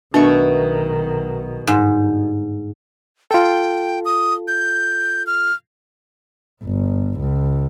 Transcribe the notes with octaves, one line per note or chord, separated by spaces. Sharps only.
B1 B2 D#3 A3 D4 C#6
G1 G#2
F4 A4 G5
D#6
G6
F6
G1
C#2